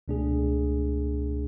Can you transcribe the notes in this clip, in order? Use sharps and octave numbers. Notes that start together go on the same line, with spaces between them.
C#2 B2 A3 D4 G#4